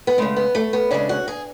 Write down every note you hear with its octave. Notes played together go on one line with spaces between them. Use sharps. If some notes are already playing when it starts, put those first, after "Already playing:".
B3
C#3 G#3 A3
B3
A3
B3
C#3 G#3 D4
F#4
G#4